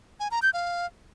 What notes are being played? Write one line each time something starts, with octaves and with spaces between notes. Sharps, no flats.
G#5
A#5
G6
F5